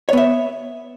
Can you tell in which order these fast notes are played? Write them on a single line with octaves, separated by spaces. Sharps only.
C#5 B3 E5